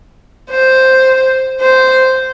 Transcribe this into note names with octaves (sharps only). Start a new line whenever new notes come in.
C5
C5